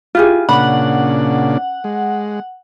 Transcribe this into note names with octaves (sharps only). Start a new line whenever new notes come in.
E4 F4 G4 G#4
A#2 C#3 C#4 D4 F#5 B5
G#3